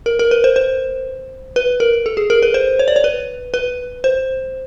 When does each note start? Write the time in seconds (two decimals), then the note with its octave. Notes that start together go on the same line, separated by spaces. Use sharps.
0.06 A#4
0.19 A#4
0.31 B4
0.44 C5
0.56 C5
1.56 B4
1.80 A#4
2.06 A4
2.17 G#4
2.30 A#4
2.43 B4
2.54 C5
2.79 C#5
2.88 D5
2.96 C#5
3.04 B4
3.54 B4
4.04 C5